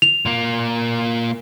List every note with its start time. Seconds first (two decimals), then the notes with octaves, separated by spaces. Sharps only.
0.02 F7
0.25 A#2 A#3